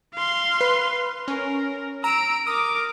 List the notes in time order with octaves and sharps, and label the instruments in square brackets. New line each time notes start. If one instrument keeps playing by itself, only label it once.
[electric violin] F5 C6
[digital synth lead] B4
[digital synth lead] C#4 [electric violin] A#4
[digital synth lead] A#5 [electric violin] E6 D7
[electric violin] A#4 D6 [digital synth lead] D#6